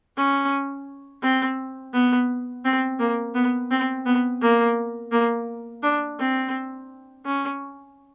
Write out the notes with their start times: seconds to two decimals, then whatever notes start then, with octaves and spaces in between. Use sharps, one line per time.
0.17 C#4
1.23 C4
1.93 B3
2.65 C4
2.99 A#3
3.35 B3
3.71 C4
4.06 B3
4.42 A#3
5.12 A#3
5.83 D4
6.19 C4
7.25 C#4